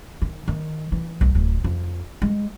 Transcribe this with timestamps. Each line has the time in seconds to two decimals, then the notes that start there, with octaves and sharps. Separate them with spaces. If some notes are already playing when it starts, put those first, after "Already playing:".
0.22 D#3
0.48 D#3
0.92 E3
1.21 B1
1.35 D1
1.64 F2
2.22 G#3